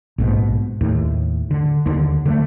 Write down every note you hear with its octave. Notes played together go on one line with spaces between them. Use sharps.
A#1 G#2 B2
D#2 A2
D3
D#2 D3
D3 G#3 A3